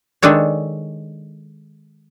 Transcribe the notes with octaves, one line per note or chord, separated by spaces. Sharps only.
D#3 G#3 D4 A4 C#5